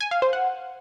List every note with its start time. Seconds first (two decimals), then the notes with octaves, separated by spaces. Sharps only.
0.01 G#5
0.11 F5
0.22 C5
0.33 F#5